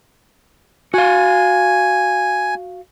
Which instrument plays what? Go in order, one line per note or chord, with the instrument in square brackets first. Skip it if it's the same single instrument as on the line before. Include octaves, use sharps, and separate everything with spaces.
[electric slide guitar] F#4 F5 [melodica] G#5